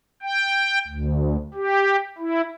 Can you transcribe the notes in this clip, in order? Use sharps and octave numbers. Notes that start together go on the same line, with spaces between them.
G5
D2
G4
E4